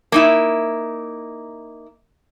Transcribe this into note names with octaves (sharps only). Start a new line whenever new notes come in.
A#3 D#4 E4